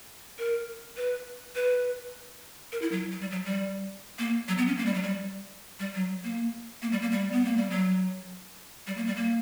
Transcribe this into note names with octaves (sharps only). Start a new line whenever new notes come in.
A#4
B4
B4
A#4
E4
F#3
F#3
G3
F#3
G3
A#3
F#3
B3
C#4
A#3
G3
F#3
G3
G3
F#3
A#3
A#3
G3
A#3
G3
B3
A#3
G3
F#3
G3
A#3
G3
A#3